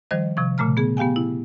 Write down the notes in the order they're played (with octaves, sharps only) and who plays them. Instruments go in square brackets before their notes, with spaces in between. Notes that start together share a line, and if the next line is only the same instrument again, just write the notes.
[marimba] D#3 F3 G3 C5 D#5
C3 F3 C#6
A#2 C#3 A3 A#5 F6
B3 G#4
B3 G4 F5 G5 G#5
E4